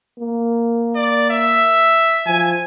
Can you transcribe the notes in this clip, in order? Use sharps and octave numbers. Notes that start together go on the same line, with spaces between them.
A#3
D5
E5
F3 G#5